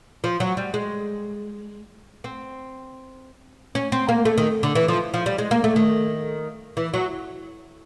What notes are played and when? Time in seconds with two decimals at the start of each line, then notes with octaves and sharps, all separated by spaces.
0.24 F3
0.40 F#3
0.57 G3
0.74 G#3
2.24 C4
3.75 C#4
3.92 C4
4.09 A#3
4.25 A3
4.38 D#3
4.63 D3
4.75 E3
4.88 F3
5.14 F3
5.26 G3
5.38 G#3
5.51 A#3
5.64 A3
5.76 D#3
6.77 E3
6.94 F#3